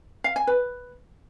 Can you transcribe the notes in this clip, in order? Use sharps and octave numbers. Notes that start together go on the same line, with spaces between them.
F5
G#5
B4